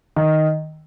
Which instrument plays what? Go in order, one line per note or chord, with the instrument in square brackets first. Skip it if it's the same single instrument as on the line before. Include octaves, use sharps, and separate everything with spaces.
[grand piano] D#3